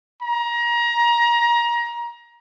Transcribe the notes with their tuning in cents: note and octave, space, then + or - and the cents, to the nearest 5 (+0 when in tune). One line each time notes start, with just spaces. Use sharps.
A#5 +25